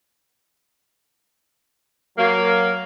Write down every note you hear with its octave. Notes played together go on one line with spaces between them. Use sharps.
F#3 A#3